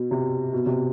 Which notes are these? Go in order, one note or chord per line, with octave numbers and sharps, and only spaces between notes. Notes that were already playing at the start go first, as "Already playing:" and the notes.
Already playing: B2
C3
B2
C3